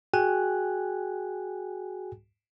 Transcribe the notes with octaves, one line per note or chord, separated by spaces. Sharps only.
F#4 G#4 G5 G#5 F#6